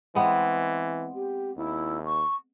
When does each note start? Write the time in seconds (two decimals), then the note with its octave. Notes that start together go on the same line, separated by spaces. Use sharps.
0.15 E3 G#3 B3 C4
1.14 G4
1.57 D#2 E4
2.05 C#6